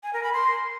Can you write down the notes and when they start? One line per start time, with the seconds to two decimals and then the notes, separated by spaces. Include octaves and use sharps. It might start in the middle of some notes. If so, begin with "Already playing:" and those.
0.03 G#5
0.13 A#4
0.23 B5
0.33 C6